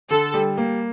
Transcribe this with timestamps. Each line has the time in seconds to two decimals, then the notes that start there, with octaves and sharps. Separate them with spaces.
0.10 D3 A4
0.34 G3
0.58 A#3